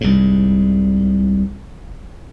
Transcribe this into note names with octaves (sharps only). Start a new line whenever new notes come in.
C2 G#2